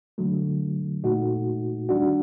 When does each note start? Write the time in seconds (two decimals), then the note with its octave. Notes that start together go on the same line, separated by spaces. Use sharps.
0.18 D3 F#3 A3
1.04 A#2 A3 D#4 F#4
1.89 D#3 G3 D4 F#4